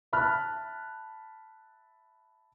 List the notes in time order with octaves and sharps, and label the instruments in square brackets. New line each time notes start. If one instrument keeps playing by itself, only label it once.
[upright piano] E5 A5 B5 F6 F#6